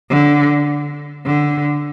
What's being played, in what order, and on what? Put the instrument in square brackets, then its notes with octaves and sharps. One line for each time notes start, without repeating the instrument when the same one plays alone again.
[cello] D3
D3